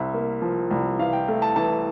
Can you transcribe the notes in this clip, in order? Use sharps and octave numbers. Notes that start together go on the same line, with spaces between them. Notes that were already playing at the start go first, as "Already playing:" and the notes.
Already playing: C2 E5
A#3
F3
C2
E3 F5
G5
A3
A5
E3 A5